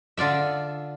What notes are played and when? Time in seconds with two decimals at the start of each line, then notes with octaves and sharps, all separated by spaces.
0.17 D3 F4 D5 E5